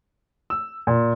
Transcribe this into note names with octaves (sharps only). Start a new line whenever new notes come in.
E6
A#2